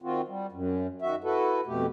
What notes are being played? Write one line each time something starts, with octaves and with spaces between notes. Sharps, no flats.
D#3 C4 F4 F#4
G3
F#2
D#3 F#4 E5
E4 F#4 A4 B4
F2 B2 A3 G4